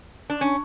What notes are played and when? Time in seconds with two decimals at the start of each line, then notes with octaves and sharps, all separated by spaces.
0.30 D4
0.41 C#4